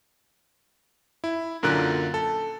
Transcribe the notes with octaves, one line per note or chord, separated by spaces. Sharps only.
E4
F#2 A#2 D3 A#4 F#6
A4